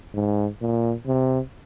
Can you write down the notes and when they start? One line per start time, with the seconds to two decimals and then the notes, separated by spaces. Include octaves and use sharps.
0.14 G#2
0.61 A#2
1.07 C3